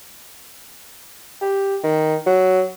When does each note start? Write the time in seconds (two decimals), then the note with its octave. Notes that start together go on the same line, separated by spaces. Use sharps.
1.42 G4
1.84 D#3
2.27 F#3